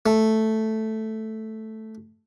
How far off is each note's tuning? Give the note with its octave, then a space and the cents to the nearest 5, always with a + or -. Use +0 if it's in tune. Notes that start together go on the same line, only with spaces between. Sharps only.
A3 +0